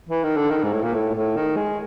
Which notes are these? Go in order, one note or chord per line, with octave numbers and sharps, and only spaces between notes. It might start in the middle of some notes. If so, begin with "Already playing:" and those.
E3
D#3
D3
D#3
G#2
A2
A#2
A2
A2
D#3
G#3